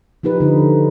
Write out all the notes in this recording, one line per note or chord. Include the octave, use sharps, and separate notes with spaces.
F3 D#4 G4 B4
D3 D#4